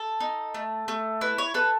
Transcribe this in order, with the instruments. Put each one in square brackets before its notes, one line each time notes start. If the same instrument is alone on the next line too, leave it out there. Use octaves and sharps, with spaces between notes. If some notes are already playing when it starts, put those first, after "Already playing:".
Already playing: [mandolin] A4
D#4
A3
A3
E4 B4
C#5
A4 B4